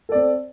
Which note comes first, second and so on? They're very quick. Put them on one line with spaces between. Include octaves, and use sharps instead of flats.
A4 D5 C4